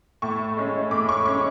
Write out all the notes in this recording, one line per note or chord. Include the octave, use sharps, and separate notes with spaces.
A2 C#6
G#3 C#4
A2 D6
C#6
G#3 C#4 C#6